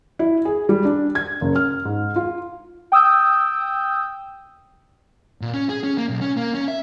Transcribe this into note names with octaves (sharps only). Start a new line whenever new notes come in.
E4
G#4
G3
D4
G#6
F#1
F6
G#2
F4
G5 D#6 E6 G6
A#2
C#4
G#4
C#4
A#3
B1
C#4
A#3
C#4
E5